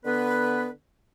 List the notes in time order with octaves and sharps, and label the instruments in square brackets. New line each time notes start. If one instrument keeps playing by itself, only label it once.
[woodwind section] D3 B3 B4